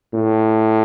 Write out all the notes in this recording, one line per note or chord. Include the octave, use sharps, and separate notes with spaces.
A2